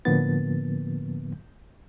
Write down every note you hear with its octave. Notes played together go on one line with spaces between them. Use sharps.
A2 D3 F3 A#3 B3 A6